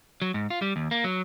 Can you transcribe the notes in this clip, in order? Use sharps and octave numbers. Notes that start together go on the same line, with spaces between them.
F#3
G#2
F4
G3
D#2
A#3
F#3